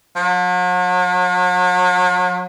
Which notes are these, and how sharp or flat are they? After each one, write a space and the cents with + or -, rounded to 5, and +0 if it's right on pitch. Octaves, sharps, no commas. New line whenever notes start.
F#3 -40